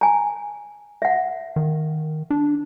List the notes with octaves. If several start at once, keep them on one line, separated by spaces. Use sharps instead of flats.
G#5 A#5
E5 F#5
D#3
D4